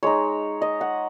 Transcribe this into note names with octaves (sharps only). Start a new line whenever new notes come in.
G#3 D#4 C#5
D#5
F#5